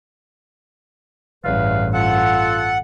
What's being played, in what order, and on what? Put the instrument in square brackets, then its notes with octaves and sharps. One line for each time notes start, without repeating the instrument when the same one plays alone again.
[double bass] A1 G2 [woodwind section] E2 B4 F5
[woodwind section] F4 A4 [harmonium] F#5